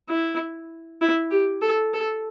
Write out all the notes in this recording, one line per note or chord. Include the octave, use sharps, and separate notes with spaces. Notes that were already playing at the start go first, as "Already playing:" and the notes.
E4
E4
G4
A4
A4